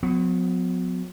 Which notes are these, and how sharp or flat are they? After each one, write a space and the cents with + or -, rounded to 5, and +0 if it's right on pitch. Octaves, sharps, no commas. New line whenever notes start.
F#3 -40 B3 +30